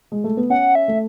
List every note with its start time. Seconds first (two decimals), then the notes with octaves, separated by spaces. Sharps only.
0.12 G#3
0.24 A3
0.37 B3
0.50 C#4 F#5
0.75 E5
0.88 A3